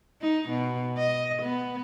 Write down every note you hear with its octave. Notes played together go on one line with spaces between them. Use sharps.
D#4
B2
D#5
B3